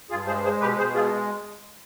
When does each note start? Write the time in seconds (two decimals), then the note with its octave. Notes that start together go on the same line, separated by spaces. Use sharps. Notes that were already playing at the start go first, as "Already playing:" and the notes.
0.10 G2 F4 G#4
0.27 G#3 G#4 C5
0.44 G#3 G#4 C5
0.61 B2 G4 B4
0.78 B2 G#4 C5
0.95 G#3 F4 G#4